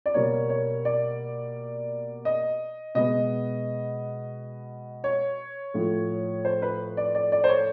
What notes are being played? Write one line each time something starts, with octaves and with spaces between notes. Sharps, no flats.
D5
B2 G3 A#3 C#5
C#5
D5
D#5
B2 G#3 B3 D#5
C#5
A2 F3 A3
C5
B4
D5
D5
D5
C5
C#5